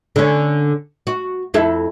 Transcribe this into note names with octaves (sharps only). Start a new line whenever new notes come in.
D3 C#4
F#4
F2 E4 A4